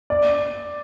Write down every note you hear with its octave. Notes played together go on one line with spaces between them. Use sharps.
D5